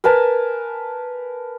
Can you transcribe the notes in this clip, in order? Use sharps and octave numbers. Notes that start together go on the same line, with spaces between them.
A#4 B4 G#5 A5